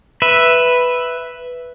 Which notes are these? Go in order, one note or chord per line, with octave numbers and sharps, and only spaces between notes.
B4 E5